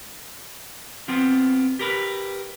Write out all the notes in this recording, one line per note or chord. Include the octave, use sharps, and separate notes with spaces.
B3 C4 F4
G4 A#4 B4